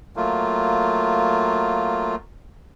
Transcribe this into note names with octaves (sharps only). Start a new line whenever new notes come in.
F#3 A3 A#3 F4